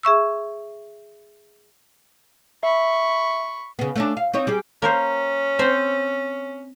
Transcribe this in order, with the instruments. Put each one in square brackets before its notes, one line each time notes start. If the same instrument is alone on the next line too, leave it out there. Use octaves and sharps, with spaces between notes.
[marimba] G#4 E5 C#6 E6
[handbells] E5 [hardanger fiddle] B5 C#6
[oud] C#3 B3
A3 C#4 D4
F5
C4 D#4 C#5
G3 G4 G#4
[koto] A#3 A#4 C5 [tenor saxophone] C#4
[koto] C4 C5